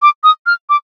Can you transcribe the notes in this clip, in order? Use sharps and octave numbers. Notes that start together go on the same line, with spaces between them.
D6
D#6
F6
D6